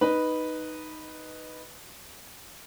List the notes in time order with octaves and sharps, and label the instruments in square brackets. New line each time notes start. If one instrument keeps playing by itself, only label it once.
[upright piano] D#4 B4